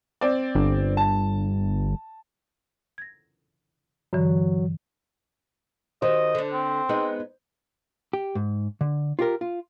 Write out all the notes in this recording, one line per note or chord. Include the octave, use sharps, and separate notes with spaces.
C4 D5
G1
A5
G#6 A#6
G2 D3 E3 F#3
D#3 F#4 G4 C5 D#5
D3 D4
C4
G#3 B3 D#4
G4
G#2
D3
F4 G4 A#4
F4